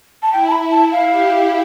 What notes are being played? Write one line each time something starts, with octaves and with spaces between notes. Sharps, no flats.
A5
E4 G5
A5
B5
A5
F5
G4